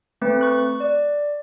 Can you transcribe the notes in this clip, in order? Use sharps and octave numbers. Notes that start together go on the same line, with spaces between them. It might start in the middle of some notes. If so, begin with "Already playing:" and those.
A3 C4 B4
C#6 F#6
D5